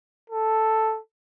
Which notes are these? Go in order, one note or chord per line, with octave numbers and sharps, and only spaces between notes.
A4